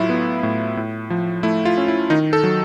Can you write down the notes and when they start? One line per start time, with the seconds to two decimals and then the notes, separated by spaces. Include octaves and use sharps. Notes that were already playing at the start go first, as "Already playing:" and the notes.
Already playing: A2 F#3 E4 F4
0.09 B3
0.43 A2
0.77 A2
1.10 F3
1.43 A3 E4
1.65 F4
1.77 C#4
1.88 E4
2.10 D#3 D#4
2.33 A4
2.44 F#3